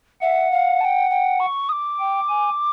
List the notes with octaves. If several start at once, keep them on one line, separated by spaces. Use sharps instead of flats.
E5 F#5
F5
A5
G5
G5
C#6
D#6
D6
G5
G#5